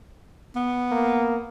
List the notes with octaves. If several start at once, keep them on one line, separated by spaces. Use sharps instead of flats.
B3
A#3